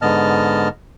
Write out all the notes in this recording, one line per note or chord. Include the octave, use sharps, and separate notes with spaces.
G#2 D3 B3 D#5 A5 F6